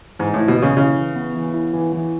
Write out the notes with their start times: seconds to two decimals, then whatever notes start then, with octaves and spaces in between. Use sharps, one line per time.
0.19 G#2 E3
0.34 A2 E4
0.48 B2
0.58 C#3 E3
0.77 C#3 E4
0.96 E3
1.16 B3
1.35 E3
1.54 E4
1.73 E3
1.92 E3